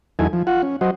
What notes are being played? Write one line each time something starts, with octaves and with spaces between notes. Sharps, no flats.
E2 F#3 D#4 E4 A4 G#5
F3
F4 F#5
C#4
F#3 F#4 C5 D#5